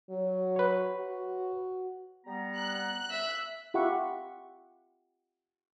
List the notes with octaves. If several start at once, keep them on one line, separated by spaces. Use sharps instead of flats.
F#3
B4 C#5
F#4
G3 B3 A#5
F#6
E5
F4 G4 E5 F#5 B5 C#6